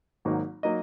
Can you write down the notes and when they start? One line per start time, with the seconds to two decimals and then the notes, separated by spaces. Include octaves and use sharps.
0.25 G#1 G#2 F#3 A#3 D#4
0.63 F#3 A#3 D#4 D#5